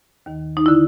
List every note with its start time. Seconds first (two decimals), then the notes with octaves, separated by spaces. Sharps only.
0.26 D#2 D#3
0.57 D#4
0.66 D3 E4